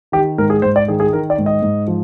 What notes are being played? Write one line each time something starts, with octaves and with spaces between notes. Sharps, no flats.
D#3 G4
G#2 A#4
G#4
G#2 C5
D5
D#3 G#4
G#4
D#3 A#4
D5
G#2
D#5
G#2
F3